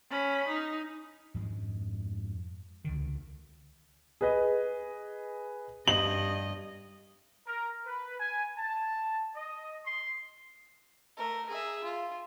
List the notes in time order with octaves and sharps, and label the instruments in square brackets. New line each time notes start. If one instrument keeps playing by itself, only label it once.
[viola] C#4 B5
D#4
[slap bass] F2 G#2 G#3
C#2 D3 D#3
[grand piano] G#4 B4 D#5
[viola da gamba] G2 D#5 [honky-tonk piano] F#7
[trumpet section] A#4
B4
G#5
A5
D#5
C6
[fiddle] A3 A#4
G#4 E5
F4